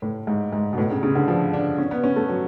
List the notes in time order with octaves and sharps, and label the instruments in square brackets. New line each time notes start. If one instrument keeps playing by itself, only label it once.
[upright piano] A2
G#2
G#2
B2
A2
C#3
C#3
D3
F3
D4
C#4
B3
C#4
A3
F#3